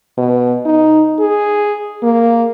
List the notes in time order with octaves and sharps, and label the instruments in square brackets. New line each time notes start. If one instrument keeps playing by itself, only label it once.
[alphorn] B2
D#4
G#4
A#3